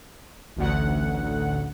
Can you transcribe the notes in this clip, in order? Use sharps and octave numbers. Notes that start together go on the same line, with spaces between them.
A1 D2 F#5